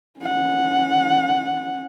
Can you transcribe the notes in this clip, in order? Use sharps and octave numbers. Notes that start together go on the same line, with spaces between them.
C#4 F#5